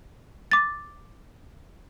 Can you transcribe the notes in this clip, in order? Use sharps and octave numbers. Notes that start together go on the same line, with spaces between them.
D6 A6